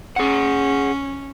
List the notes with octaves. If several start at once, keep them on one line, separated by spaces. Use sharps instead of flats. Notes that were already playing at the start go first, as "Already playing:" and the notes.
C#4 G#4 F#5